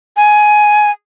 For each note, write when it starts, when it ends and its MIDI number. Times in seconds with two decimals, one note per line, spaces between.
0.17 0.91 80